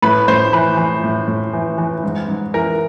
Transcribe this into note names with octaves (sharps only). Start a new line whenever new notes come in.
A2 B4
A2 C5
E3 B4
E3
A2
A2
E3
E3
G#2
G#2
E3 A#4